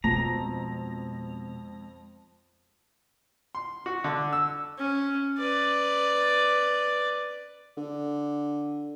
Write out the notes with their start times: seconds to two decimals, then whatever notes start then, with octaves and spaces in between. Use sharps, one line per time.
0.04 F2 B2 G#3 A#5
3.55 C6
3.86 F#4
4.04 D3
4.33 E6
4.78 C#4
5.38 B4 D5
7.77 D3